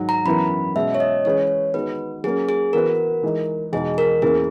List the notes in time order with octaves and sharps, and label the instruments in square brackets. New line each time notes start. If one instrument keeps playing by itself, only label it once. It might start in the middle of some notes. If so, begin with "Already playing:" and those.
Already playing: [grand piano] G#2 D#3 F#3
[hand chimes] A#5
[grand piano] F#2 E3 B3 E4 A#4 [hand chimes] B5
[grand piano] B2 G#3 C#4 [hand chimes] E5
[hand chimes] C#5
D#5
[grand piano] E3 G#3 C#4 G#4 B4 [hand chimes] C#5
[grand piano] D#3 G#3 B3 F#4 [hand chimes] B4
[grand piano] F#3 A#3 C#4 [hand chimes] G#4
[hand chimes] G#4
[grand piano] E3 B3 F#4 B4 [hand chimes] A#4
[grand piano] E3 G#3 D#4
[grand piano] E2 B2 G#3 D#4 [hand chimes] G#4
[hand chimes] A#4
[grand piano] E2 C#3 E3 A#3 [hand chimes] G#4